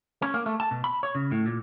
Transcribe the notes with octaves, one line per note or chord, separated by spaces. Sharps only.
C#4
A#3
A3
A5
B2
B5
C#5
C#3
A2
A#2